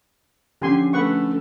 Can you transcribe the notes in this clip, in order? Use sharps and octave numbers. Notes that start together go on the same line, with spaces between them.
D3 F3 C#4 G4 G#5 C6
A3 B4 F#5 C#6